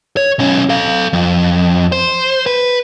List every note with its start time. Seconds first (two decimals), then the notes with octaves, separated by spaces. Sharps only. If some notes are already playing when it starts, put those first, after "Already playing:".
0.17 C#5
0.39 B1 C#4
0.69 A4 F5
1.13 F2
1.92 C5
2.46 B4